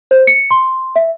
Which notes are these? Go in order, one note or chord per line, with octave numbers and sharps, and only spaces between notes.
C5
C#7
C6
E5